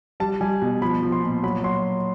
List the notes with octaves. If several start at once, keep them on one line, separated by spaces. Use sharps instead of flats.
G3 A5
G3 G#5
B2
F3 B5
F3
C6
A#2
F#3 B5
F#3 C6